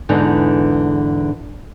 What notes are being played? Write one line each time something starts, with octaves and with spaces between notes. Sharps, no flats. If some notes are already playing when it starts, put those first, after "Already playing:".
E2 G#2 D3 E3 D4 D#4